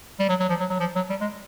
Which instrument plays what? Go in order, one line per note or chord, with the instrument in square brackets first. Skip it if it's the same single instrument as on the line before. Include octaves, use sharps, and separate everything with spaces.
[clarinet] G3
F#3
F#3
F3
F#3
F#3
F3
F#3
G3
G#3